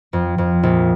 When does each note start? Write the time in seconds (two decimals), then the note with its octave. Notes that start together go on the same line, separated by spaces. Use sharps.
0.13 F2
0.38 F2
0.63 A#1